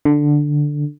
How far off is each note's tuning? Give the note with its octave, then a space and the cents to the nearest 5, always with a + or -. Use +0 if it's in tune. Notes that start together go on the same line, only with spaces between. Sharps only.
D3 +5